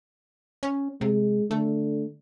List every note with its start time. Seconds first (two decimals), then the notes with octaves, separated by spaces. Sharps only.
0.63 C#4
1.01 C3 G#3
1.51 D3 A3